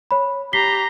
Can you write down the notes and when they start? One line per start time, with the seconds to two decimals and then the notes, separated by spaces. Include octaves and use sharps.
0.11 C#5 B5
0.53 G4 A#5 B6 C7 G7